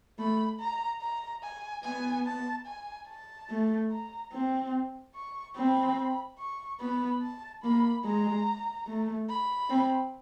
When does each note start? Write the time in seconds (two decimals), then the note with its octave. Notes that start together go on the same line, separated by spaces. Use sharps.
0.18 A3 B5
0.60 A#5
1.01 A#5
1.42 G#5
1.84 B3 G#5
2.26 A5
2.66 G#5
3.08 A5
3.50 A3
3.91 A#5
4.33 C4
5.15 C#6
5.56 C4 B5
6.39 C#6
6.80 B3 B5
7.22 A5
7.63 A#3 B5
8.05 G#3 A#5
8.87 A3
9.29 B5
9.70 C4